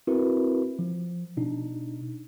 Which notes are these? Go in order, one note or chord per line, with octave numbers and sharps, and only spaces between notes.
C4 E4 F#4 A#4 B4
F3
B2 D4 D#4